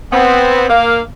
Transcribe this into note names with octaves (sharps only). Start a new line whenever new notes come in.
B3 C4
A#3 F5